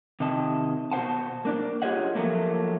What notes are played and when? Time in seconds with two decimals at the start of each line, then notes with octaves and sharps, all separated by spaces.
0.20 C3 D#3 D#5 A5
0.91 B2 F#4 C5 F#5 A5
1.45 A#3 D4 D5
1.82 F4 G4 G#4 C#5 D#5 F#5
2.15 F3 F#3 A3 A#3